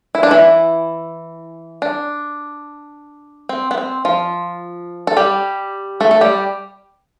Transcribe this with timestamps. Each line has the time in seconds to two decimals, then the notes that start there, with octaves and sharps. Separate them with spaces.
0.15 E4
0.23 D4
0.31 E3 E4
1.82 D4
3.49 C4
3.71 B3
3.78 C4
4.05 F3 F4
5.07 A4
5.17 G3 G4
6.00 A3 A4
6.11 A4
6.21 G3 G4